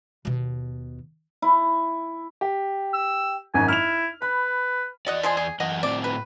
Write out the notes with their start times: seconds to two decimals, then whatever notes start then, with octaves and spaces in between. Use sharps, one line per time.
0.25 D#2 B2
1.42 E4
2.41 G4
2.94 E6
3.54 G#1 F#2 G#5
3.68 E4 F6 F7
4.22 B4 B5
5.07 E2 F#4 D5 D#5 F#5
5.23 F3 G#3 G#4
5.37 G#4
5.60 F#2 E3 D#5 F#5
5.83 A2 C4 D5
6.04 B4